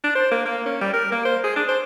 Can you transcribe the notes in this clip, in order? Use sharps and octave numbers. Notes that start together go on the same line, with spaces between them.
D4
C5
A#3
A#3
C#4
G3
A#4
A#3
C5
G#4
D4
C5